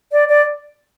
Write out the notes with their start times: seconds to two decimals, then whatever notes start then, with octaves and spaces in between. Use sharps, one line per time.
0.12 D5
0.29 D5